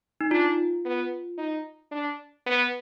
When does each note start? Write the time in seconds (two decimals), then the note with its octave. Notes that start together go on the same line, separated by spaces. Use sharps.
0.21 D#4
0.31 D4 F4
0.86 B3
1.38 D#4
1.92 D4
2.46 B3